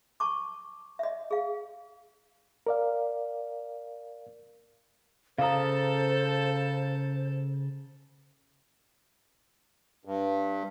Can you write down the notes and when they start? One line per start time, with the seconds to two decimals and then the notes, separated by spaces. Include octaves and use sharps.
0.20 A5 C#6 D6
0.99 D#5 E5
1.31 G#4 F5
2.67 A#4 D5 F5
5.38 C#3 A4 C5 F5 A5 A#5 D#6
10.05 G2